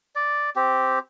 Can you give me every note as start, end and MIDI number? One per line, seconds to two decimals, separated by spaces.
0.16 0.50 74
0.56 0.99 60
0.56 0.99 67